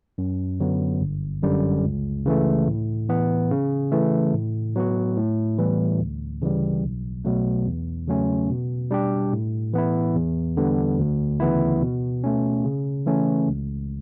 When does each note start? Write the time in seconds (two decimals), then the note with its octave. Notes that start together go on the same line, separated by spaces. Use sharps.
0.18 F#2
0.60 D3 F#3 B3
1.01 G1
1.43 F#2 D3 G3
1.84 C#2
2.26 C#3 E3 A3
2.67 A2
3.09 E3 B3
3.51 C#3
3.92 E3 A3
4.33 A2
4.76 F#3 B3 F#4
5.17 A2
5.58 E3 G3 B3
6.00 D2
6.42 C#3 E3 G3
6.84 B1
7.25 B2 F#3 A3
7.67 E2
8.08 C#3 F#3 A3 C#4
8.50 B2
8.91 G3 D4 G4
9.33 A2
9.73 E3 B3 E4
10.15 E2
10.57 D3 G3 B3
10.99 D2
11.40 C#3 E3 B3 E4
11.82 B2
12.24 A3 C#4
12.64 C#3
13.06 E3 A3 C#4
13.48 C#2